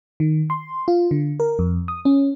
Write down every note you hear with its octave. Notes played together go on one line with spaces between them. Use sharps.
D#3
C6
F4
D3
A#4
F2
D#6
C#4